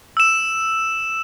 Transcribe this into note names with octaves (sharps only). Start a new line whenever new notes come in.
E6 E7